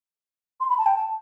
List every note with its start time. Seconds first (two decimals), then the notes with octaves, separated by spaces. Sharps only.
0.60 C6
0.69 B5
0.78 A5
0.86 G5
0.95 A5